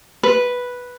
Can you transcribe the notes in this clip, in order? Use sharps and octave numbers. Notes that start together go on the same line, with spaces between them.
B4